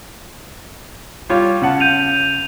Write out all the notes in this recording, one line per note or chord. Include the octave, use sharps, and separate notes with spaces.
G3 F4 C#5
C#3 F#5 A5
G6 D#7 F7